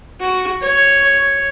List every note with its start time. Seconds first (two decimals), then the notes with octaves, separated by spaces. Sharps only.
0.20 F#4
0.62 C#5